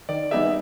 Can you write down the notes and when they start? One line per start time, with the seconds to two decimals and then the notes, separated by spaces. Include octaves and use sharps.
0.09 D#3 D5
0.31 G3 B3 D#4 G#4 E5